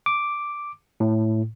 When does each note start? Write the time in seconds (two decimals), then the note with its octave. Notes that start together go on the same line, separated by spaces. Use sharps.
0.06 D6
1.00 A2